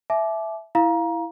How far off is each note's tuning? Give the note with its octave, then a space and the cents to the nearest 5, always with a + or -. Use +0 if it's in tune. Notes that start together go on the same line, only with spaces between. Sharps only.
E5 +0 A5 -45 D6 +0
E4 +0 F5 +0 A#5 +25